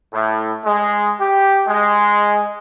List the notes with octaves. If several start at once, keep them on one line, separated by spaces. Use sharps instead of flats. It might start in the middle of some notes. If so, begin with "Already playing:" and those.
A2
G#3
G4
G#3